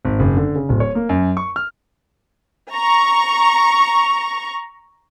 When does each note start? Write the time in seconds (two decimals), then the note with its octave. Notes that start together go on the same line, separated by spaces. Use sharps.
0.05 G#1
0.19 F#1
0.37 D3
0.56 C#3
0.69 D1
0.80 C#5
0.95 A#3
1.09 F#2
1.37 C#6
1.56 F6
2.74 A#5 C#6